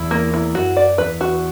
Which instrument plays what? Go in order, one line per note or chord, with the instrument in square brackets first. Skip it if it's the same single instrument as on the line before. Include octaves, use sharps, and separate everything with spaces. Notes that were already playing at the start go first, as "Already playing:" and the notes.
Already playing: [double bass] E2 [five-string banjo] E4
[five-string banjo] A#3
E4
[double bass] F#2 [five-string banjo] F#4
[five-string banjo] D5
[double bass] E2 [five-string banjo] B4
[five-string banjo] F#4